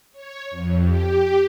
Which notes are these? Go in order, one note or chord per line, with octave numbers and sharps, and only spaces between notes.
C#5
F2
G4